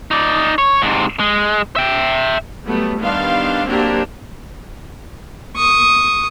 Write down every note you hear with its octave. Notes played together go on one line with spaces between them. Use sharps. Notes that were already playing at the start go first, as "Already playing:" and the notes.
D#4 D5
C#5
G#2 C3
G#3
E5 G5
F#3 G3 A3 B3
D#3 G3 B3 D4 F5 C6
F#3 A#3 C4 D4 F#4 G4
C#6 D#6